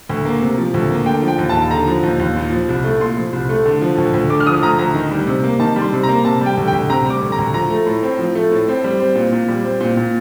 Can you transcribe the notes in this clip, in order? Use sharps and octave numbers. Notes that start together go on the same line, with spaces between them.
D2
A#3
C3
F3
D2
A#3
D3 G5
F3
G5
D#2
A5
D#2
D3 A#5
F3
D#2
D#2
A#2
F3
C2
A3
A#2 C6
F3
C2
A3
D3
F3
D2
D2
D3 D6
F6
F3 D#6
D2 A#5
D2 A#5
D#3
G3
C3
A#3
D#3 A5
G3
C6
C3
A#5
A#3
C3 A5
G3
G5
D2
G5
D2
C3 A#5
G3 D6
D2
A#5
D2
F3 A#5
A3
A2
C4
F3
A3
A2
C4
G3
C4
A#2
A#2
G3
C4
A#2
A#2